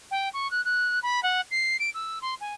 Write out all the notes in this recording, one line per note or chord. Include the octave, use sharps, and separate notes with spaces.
G5
C#6
F#6
F#6
B5
F#5
C7
D7
E6
C6
G#5